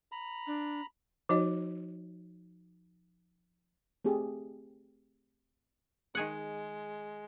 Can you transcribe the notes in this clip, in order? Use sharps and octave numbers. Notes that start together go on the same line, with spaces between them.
A#5 B5
D4
F3 D#4 F#4 C#5 D#5
A3 C4 G4 G#4
D#3 G#3 G#4 F#5